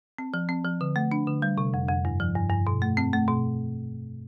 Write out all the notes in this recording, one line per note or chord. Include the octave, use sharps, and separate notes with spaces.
C4
F3
C4
F3
D3
A3
D4
D3
G3
C3
F2
F2
G2
F3
G2
G2
B2
A3
C4
A3
B2